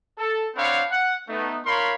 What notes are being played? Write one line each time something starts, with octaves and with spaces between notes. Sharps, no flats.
A4
C4 D4 C#5 F5 F#5 B5
F#5
A3 B3 D#4
D#4 A#4 C#5 F5 B5 C6